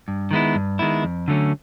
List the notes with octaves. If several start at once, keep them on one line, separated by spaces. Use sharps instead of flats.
G2
D#3 G#3 B3 E4
G2
D#3 G#3 B3 E4
F2
D3 F#3 A3 C#4